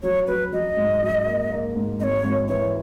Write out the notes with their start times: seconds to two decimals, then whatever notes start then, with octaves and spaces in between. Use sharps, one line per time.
0.02 F#3 C#5
0.27 F#3 B4
0.52 F#3 D#5
0.77 G#2
1.02 F#3
1.26 A#3
1.50 A#3
1.76 G#2
1.99 G#1 D#5
2.03 C#5
2.24 G#1
2.48 E3 C#5